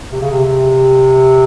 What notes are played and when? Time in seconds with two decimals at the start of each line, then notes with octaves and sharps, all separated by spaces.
0.12 C3
0.21 C#3
0.30 C3
0.45 C3